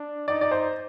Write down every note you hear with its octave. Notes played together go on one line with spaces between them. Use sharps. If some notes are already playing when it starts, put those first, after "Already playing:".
Already playing: D4
D#4 D5
D5
C5